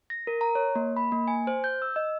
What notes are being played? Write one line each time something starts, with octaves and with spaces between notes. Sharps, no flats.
A#6
A#4
A#5
C#5
A#3
B5
A#3
G#5
C5
G6
E6
D#5